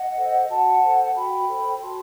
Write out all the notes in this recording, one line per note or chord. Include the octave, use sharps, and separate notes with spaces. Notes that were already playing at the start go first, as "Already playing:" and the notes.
Already playing: D#5 F#5
A4 C5
F#4 F#5 A5
A4 C5
F#4 G5 B5
A4 C5
F#4 A5 C6